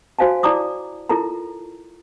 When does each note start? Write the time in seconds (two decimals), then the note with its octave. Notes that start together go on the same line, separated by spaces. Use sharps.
0.19 F#4 C5 F5 G#5 A5
0.43 E4 D5 A5 A#5 D6 D#6
1.09 E4 F4 A4 A#4 A5 A#5